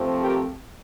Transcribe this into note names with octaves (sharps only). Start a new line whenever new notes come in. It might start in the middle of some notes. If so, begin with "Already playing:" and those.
Already playing: C3 F3 A3 C4
G4 A#4